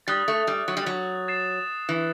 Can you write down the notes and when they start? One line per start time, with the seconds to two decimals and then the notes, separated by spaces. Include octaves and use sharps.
0.07 G3 D#6 F#6 A6
0.28 A3
0.47 G3
0.68 F#3
0.77 G3
0.86 F#3
1.28 A6 C7 E7
1.89 E3